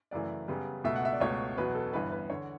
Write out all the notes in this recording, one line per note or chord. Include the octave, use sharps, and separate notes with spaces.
F#2 C#3 E3 A3 D5
F#2 C#3 G3 B3
C#2 B2 A3 E5
F#5
E5
D5
C#2 B2 A3 C#5
E2 B2 F#3 B4
A4
G1 G2 E3 B3 B4
B4
E2 D3 C#5